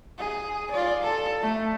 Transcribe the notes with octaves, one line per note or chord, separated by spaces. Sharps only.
G#4
F4 D5
A4
A3